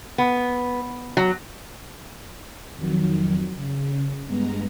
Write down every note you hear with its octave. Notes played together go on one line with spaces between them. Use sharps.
B3
F#3
F2 D#3 F#3
C#3
G2 G#3 B3 A#5